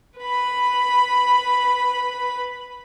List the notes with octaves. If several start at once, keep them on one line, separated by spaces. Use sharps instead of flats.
B4 B5